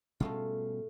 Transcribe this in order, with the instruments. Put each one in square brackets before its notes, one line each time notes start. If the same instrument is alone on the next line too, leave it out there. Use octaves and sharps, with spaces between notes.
[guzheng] G#2 A3 F4 [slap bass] B2 G3 C#4